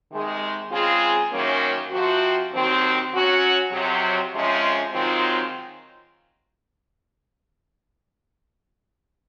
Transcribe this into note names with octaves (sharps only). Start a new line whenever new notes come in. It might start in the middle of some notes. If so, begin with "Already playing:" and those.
C3 D#3 G#3
C#3 G#3 C4 F4 G#4
F#2 D#3 F#3 A#3 C#4
C3 F3 C4 F#4
D#2 D#3 F#3 C4 F#4
F#3 C#4 F#4 C#5
F2 C3 F#3
C3 F3 G#3 C#4
G#2 D#3 F#3 C4 F4